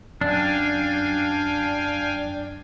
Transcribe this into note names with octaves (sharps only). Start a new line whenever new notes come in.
F#2 D4 F5 G5 G#5